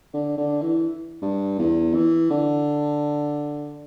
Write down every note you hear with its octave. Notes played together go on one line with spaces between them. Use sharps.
D3
D3
E3
G2
E2
E3
D3